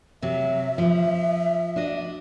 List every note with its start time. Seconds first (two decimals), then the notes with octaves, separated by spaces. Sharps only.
0.22 C3 F#3 E5
0.78 F3
1.76 D4 F#4 D#5